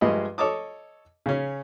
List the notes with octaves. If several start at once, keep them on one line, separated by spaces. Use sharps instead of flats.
G2 F3 G#3 A3 D#5 B5
A4 C#5 D#5 A5 D6 D#6
C#3 C#4